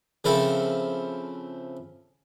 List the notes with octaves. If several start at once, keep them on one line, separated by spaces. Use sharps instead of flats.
C#3 F3 C4 E4 A4 A#4